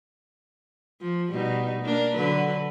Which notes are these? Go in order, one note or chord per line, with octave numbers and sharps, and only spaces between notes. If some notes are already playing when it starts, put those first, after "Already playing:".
F3
B2 G3 D#4
A#3 D4 A#4
D3 F#3 B4